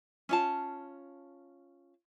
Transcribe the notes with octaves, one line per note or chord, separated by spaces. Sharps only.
C#4 F4 A5